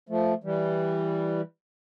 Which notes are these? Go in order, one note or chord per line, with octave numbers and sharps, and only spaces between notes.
F3 A3
E3 G3